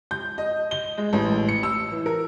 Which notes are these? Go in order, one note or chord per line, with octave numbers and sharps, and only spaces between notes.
G6
D#5
G7
G#3
A1
C#7
E6
E3
A#4